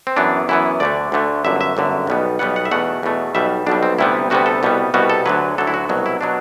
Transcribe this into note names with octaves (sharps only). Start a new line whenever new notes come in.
C4
F#2 E3 B3 D4
F#2 E3 B3 E4
D2 D3 A3 D5
D2 D3 A3
G1 F#2 D3 E5
E5
G1 F#2 D3
B1 B2 G3 B3
B1 B2 G3 B3 F#5
F#5
E5
E2 B2 A3 F#5
E2 B2 A3
B1 B2 G3 E5
B1 B2 G3 D4
C4
D2 C3 G3 B3 E4
D2 C3 G3 B3 F#4
A4
C2 B2 G3 B3
C2 B2 G3 B3 F#4
A4
D2 D3 F#3 B4
D2 D3 F#3 A4
E4
F#4
C2 B2 F#3
E4
B2 F#3 D4